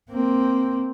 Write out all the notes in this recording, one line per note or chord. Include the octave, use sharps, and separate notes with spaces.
A#3 C4